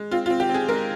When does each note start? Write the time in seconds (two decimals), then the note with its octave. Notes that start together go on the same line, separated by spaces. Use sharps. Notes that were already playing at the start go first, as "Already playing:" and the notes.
Already playing: G#3
0.11 C4 F4
0.26 F4
0.30 C4
0.40 G4
0.49 C4
0.54 G#4
0.69 G#3 A#4